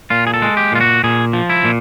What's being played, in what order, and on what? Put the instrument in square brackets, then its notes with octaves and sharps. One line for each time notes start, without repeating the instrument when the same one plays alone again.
[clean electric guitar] A#2 F4
G#4
A4
G#3
G4
A#2 F4
F#4
A#2 G#4
F3
E4
A#2